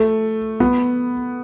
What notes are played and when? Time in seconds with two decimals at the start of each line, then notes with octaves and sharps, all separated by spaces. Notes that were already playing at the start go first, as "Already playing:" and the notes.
Already playing: A3
0.60 B3